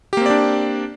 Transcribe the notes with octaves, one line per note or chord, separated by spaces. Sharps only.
A#3 C4 D4 G4 D5